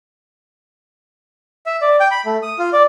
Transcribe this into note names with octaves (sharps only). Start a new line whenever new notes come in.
E5
D5
G5
B5
A3
D#6
F4
D5